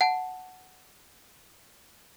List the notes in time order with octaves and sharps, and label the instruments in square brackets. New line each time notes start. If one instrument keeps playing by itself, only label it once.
[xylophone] F#5 A5